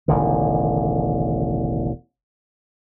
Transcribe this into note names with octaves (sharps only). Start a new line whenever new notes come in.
E1 A1 D3 D#3